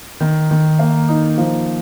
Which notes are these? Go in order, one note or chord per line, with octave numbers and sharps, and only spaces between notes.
D#3
D#3
A#3
D#4
F3